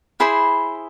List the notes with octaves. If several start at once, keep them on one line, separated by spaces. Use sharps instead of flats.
E4 G#4 C5 B5